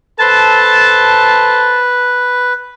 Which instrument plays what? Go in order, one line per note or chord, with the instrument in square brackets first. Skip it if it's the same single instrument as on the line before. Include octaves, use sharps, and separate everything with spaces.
[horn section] A4 C5 A5 [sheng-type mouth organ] B4